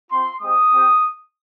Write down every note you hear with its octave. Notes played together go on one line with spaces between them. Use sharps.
C4 F4 C6
G#3 C4 G4 D#6
C4 G4